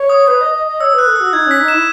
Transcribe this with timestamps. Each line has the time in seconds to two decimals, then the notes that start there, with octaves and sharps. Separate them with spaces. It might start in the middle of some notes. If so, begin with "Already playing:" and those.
Already playing: C#5
0.09 D#6
0.28 B4
0.41 D#5
0.54 D#5
0.67 D#5
0.80 C#5 E6
0.93 B4 F#6
1.07 A4
1.16 F#4 E6
1.33 D#4 G#6
1.46 C#4 B6
1.60 D#4
1.68 E4 E7